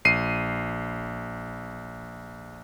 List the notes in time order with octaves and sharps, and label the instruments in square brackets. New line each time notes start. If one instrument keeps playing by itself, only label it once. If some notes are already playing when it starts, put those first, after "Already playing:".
[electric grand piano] A#1 C7 D#7